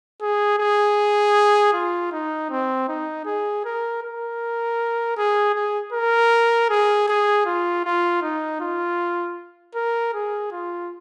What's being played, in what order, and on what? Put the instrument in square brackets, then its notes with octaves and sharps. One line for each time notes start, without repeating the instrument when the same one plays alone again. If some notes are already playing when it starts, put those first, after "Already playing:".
[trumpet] G#4
G#4
F4
D#4
C4
D#4
G#4
A#4
A#4
G#4
G#4
A#4
G#4
G#4
F4
F4
D#4
F4
A#4
G#4
F4